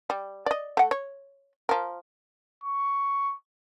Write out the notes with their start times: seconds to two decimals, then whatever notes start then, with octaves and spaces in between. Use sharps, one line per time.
0.10 G3
0.46 D5 D#5
0.77 A3 F#5
0.91 C#5
1.69 F3 A#4
2.64 C#6